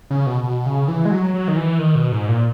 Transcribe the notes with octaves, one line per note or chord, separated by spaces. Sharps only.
C#3
B2
B2
C#3
E3
G#3
F#3
F#3
D#3
E3
D#3
B2
G#2
A#2